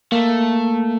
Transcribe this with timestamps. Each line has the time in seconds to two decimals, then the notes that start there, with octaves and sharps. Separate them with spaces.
0.12 A3 A#3